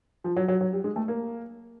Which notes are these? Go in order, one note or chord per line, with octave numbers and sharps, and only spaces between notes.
F3
F#3
F#3
F#3
G3
G#3
A3
A#3